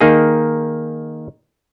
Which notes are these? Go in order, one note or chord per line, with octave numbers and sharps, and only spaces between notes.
D#3 A#3 D#4 G#4